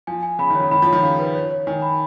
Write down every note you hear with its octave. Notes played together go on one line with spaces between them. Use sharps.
F3 G#5
G#5
C#3 B5
D#3
C#3 C#5
D#3 B5
F3
C#5
D#3
C#3 F5
B4
C#5
C#5
D#3 G#5
B5